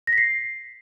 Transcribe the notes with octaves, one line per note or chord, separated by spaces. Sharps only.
A#6
B6
C7